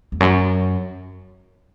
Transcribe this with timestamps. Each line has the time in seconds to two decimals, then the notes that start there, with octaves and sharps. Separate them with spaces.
0.12 E2
0.20 F#2